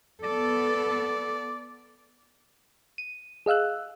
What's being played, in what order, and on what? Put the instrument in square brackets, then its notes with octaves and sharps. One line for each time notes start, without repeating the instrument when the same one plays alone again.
[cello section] B3 A4 [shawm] D5
[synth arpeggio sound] D#7
G#4 D#5 F5 E6 F#6